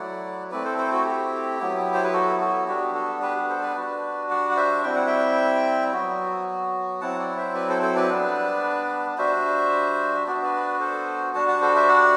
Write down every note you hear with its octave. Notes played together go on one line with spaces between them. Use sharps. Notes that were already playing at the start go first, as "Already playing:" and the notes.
Already playing: F#3 A3 E4 D5 F#5
A3 C4 E4 B4 D5
A4 C5
A4 C5
F#4 A4
G4
F#3 B3 E4
C5
B4
F#4 A4
F#4 A4
G3 B3 D4 F#4 G4
F#4 A4
G4 B4
A4 C5
B4 D5
G3 D4 F#4
D5 F#5
F#5
C5 E5
G3 C4 E4 G5
F#5
E5 G5
F#3 B3 F#4
F#3 C4 E4 F#5 A5
D5 F#5
C5 E5
B4 D5
A4 C5
A4 C5
B4 D5
G3 B3 D4
G3 D4 F#4 C5 E5
B3 D4 F#4 D5
E5
B4 D5
A4 C5
G3 D4 F#4 F#5 A5
F#5 A5
A4 C5
C5 E5
D5 F#5